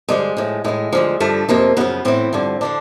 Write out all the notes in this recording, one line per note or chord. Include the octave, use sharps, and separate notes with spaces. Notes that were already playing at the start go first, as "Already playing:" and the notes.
G2 D3 F3 G#3
A2 F3
A2 E3 G#3
D2 D3 F3
G2 D3 F3 A3
F2 C3 F3 A#3
F#2 C#3 F3 B3
A2 E3 C4
G2 D3 F3
D3 F3 D4